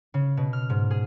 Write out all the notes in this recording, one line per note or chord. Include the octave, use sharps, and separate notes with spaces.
C#3
B2
F6
G#2
G#4